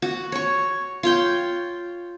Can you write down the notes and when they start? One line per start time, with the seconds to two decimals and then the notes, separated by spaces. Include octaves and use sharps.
0.02 F#4
0.32 C#5 C#6
1.03 F4 C#5 G5